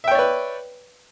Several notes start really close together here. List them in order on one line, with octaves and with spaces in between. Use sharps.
E5 G5 C#5 D5 B4